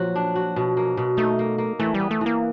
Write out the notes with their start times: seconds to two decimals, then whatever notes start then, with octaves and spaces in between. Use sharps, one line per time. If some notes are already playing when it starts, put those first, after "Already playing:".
Already playing: A#2 F3 F#3 F#4
0.15 D4
0.36 F#4
0.56 B2
0.77 A#3
0.97 B2
1.17 A3 D#4
1.39 A#3
1.58 A#3
1.79 E3 A3
1.94 G3
2.00 B3
2.11 A3
2.21 E3
2.26 A#3